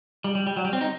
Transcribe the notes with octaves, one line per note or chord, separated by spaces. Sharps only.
G3
G3
G3
F#3
G3
C4
D#4